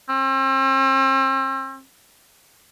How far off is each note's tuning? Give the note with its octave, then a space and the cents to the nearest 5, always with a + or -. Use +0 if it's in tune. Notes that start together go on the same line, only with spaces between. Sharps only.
C4 +40